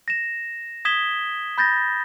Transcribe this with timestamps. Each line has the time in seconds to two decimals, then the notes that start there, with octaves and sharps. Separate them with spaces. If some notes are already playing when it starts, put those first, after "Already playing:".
0.08 A#6 E7
0.85 D#6 G#6 B6 E7 G7
1.58 B5 G6 A6 A#6